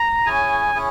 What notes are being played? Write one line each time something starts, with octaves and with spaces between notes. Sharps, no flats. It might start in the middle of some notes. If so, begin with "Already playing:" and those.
Already playing: A#5
C#4 E4 G#4 C#5 G#5
C#4 E4 G#4 C#5